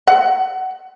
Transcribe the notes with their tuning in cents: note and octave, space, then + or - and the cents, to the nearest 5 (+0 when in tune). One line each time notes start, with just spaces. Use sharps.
F#5 +25